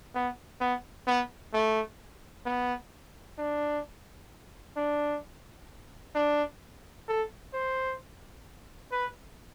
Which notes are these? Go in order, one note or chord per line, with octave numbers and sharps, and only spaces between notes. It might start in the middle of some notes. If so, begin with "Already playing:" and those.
B3
B3
B3
A3
B3
D4
D4
D4
A4
C5
B4